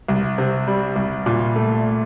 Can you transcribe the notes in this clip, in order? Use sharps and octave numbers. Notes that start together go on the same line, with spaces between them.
C2
C3
G3
C2
A#2
A3